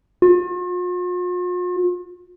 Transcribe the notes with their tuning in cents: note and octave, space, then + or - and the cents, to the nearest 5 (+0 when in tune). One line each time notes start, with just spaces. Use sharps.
F4 +45